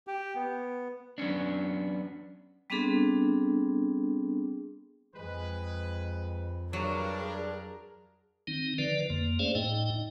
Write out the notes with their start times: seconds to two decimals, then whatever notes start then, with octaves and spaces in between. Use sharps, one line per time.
0.07 G4
0.35 B3
1.18 F#3 B3 C#4 D4
2.70 G3 B3 C4 D4 G#4 A4
5.16 F2 G#3 B4
6.73 G2 F#3 D4 G#4 A#4
8.47 D#3 C4 D#4
8.78 D3 F3 B4 D5
9.10 F2 A#3
9.39 A3 C#4 G#4 C5 D5 F5
9.55 A2 D#4 D#5 G5